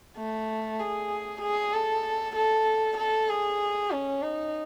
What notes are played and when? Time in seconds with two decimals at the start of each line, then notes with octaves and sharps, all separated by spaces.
0.17 A3
0.79 G#4
1.41 G#4
1.73 A4
2.36 A4
2.98 A4
3.29 G#4
3.91 C#4
4.22 D#4